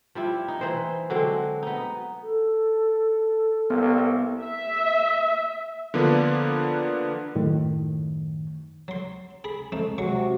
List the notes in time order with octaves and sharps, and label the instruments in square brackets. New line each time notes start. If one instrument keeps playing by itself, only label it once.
[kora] F3 G3 E4
D#4
E3 C5
D3 F#3 G#3 C4
B3 D#4
[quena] A4
[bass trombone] C2 [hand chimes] B3
[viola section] E5
[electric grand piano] D3 F3 A#3 B3 D4
[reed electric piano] F#2 A2 D#3
[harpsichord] F#3 C6
G#4 B5
F2 A3 D#4
[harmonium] C3 F#4 [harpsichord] F#3 G#3 C#6